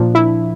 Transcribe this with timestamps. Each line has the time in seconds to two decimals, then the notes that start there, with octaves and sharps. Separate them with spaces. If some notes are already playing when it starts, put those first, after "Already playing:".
Already playing: A#2 F3 D4
0.15 E4